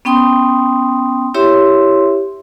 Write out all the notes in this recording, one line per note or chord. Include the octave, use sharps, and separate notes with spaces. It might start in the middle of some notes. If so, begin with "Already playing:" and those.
B3 C#4 G5 C6 D#6
E4 G4 C#5 E5 C6